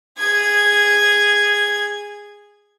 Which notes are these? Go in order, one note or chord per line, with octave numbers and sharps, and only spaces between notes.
G#4 G#6